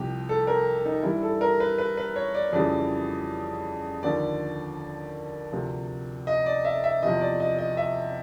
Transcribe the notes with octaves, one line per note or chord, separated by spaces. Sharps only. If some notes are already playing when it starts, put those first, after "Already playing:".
Already playing: C2 C3 F3 G4
A4
A#4
D#4
G2 E3 G3 E4
A4
A#4
B4
B4
B4
C#5
D5
F2 C#3 E3 G3 D5
D#2 D3 F3 D5
D2 C3 F3
D#5
D5
E5
E5
E2 C3 F3 D#5
D5
D#5
D#5
E5